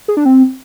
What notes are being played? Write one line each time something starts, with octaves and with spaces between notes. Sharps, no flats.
G#4
D4
C4